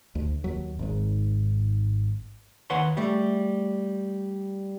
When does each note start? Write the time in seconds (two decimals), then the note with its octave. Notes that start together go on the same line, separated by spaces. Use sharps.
0.15 D2
0.44 D#2 F#3
0.79 G#1 G#2
2.70 D#2 B4 C#5 F#5 G#5 C6
2.97 G3 A3